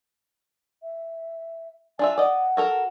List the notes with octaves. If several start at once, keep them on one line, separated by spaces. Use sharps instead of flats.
E5
D4 F4 E5 G#5
D5 D#5 F#5
F#4 A4 A#4